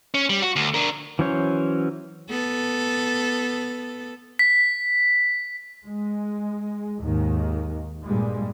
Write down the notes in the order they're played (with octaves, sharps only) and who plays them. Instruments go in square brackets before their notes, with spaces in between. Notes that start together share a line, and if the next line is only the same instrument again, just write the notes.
[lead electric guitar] C#4
G3
F#4
D2
D4 A#4
[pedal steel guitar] E3 F#3 C#4 C5 C#5
[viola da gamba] B3 A4
[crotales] B6
[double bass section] G#3
D#2 G#2 D#3
G2 A#2 G3 G#3